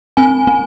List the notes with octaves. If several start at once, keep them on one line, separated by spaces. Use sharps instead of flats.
C4 G#5
C4